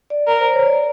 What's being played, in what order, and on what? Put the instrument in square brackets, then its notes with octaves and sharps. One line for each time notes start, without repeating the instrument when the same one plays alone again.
[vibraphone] D5
[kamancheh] A#4
[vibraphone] C5
C#5
D5